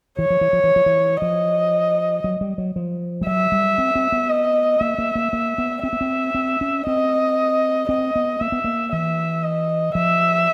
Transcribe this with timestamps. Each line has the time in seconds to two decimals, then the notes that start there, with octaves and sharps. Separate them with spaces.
0.19 E3 C#5
0.30 F3
0.41 E3
0.53 F3
0.64 E3
0.76 F3
0.86 E3
1.21 F3 D#5
2.24 F#3
2.41 G3
2.58 F#3
2.76 F3
3.21 G3
3.27 F#3 E5
3.52 G3
3.78 C4
3.95 C4
4.12 B3
4.30 D#5
4.80 A#3 E5
4.98 A#3
5.15 A#3
5.33 A#3
5.58 B3
5.83 C4 E5
5.93 B3
6.01 C4
6.35 C4
6.61 C#4
6.87 C4 D#5
7.89 C4 D#5
8.16 B3
8.41 A#3 E5
8.52 B3
8.64 A#3
8.92 E3 E5
9.44 D#5
9.94 F3 E5